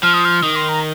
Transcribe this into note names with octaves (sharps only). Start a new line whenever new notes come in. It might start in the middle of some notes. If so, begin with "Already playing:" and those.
F3 F6
D#6
F6
D#3 D#6
C6
A#5